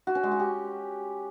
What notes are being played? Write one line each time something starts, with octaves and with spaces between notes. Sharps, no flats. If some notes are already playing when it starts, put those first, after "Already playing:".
F#4
C#4
G#3
F#4
G4